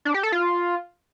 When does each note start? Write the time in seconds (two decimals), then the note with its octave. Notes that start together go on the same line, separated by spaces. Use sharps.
0.05 D4
0.14 G4
0.23 A4
0.32 F4